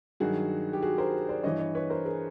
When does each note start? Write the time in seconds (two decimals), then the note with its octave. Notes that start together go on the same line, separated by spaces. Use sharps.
0.20 G2 D#3 F#3 F#4 G#4
0.73 G4
0.82 F#4 G#4
0.98 A#4 C5
1.29 C5 D5
1.43 G2 E3 C#5 D#5
1.59 C#5 D#5
1.75 B4 C#5
1.90 A#4 C5
2.05 G#4 A#4